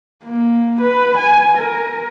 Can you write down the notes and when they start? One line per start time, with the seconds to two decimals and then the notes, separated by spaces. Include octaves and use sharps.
0.24 A#3
0.81 B4
1.17 G#5
1.57 A#4